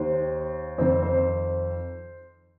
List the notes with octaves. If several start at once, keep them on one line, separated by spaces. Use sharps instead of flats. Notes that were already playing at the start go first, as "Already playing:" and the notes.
Already playing: D#2 D#3 C5
F2 D#3 C4
C5